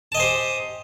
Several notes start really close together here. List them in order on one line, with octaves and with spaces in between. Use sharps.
A5 D#5 G#5 C5 G4